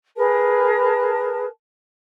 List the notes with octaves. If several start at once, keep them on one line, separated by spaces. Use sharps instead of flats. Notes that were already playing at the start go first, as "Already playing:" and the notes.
G#4 A#4 B4 A5